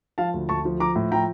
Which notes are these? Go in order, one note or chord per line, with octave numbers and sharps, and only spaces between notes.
F3 F5 A5
D2
D2 A5 C#6
F3
F3 A#5 D6
A2
F3 G5 A#5